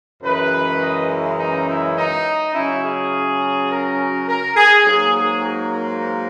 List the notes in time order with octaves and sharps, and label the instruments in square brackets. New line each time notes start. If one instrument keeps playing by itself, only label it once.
[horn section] F#2 C#3 E3 G#3 B4
D#5
E4
D#4
E4
D#4
C#3 F#3 C#4 E4
G#4
A#4
A#4
G#4
G#2 F#3 A#3 G#4
G#4
A#4
A#4